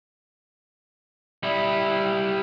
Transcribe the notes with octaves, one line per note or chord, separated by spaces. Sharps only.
G3 E4